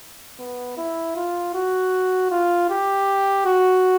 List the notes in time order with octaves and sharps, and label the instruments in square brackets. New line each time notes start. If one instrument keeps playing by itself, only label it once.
[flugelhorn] B3
E4
F4
F#4
F4
G4
F#4